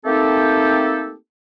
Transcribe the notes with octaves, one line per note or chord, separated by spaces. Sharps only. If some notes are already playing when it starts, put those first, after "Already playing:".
A3 A#3 C4 D#4 G4 A4